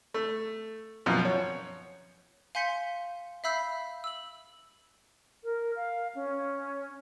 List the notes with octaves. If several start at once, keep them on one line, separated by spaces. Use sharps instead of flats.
A3
F#2 B2 F3
C#5
F5 G#5 C6 G6 B6 C#7
E5 F5 B5 E6 G6 C7
E6 F#7
A#4
F5
C#4